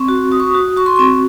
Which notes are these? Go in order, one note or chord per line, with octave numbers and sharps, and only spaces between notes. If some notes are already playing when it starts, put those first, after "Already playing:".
Already playing: C4 C#6
F#4
F#4 D#6
C#6
D#6
F#4
F#4 C#6
C6
C4 C#6